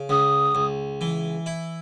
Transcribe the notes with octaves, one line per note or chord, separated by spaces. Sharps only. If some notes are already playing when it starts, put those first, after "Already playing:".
Already playing: C#3
C#2 D#6
C#2
E3
E4